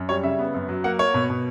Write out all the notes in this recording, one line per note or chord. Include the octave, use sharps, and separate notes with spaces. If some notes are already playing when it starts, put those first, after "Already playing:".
Already playing: F#2
G3 C#5
C#3 E5
B3
F#2
F#3
A#3 F#5
A#3 C#5
B2
B2